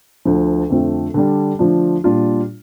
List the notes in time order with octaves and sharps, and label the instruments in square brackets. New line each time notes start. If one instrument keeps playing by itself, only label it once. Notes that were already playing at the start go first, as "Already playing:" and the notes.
[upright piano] D2 D3 F3
F2 D3 A3 C4 F4
D3 G3 D4
D3 F3 A3 D4 F4
A#2 G3 D4 F4